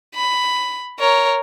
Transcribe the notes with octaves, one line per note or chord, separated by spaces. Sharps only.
B5
A#4 C#5